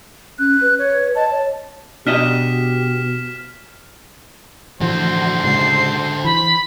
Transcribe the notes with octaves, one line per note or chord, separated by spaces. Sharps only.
C#4 F#6
B4
C#5
D#5 A5
C#5
B2 D4 F#4 G4 D#5 F6 B6 E7
A2 D3 E3 F3 F#4 C5
A2 C#3 G#3 C7
E3 B5